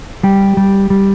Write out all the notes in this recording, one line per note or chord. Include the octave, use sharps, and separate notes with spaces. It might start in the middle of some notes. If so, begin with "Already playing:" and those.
G3 G4
G3
G3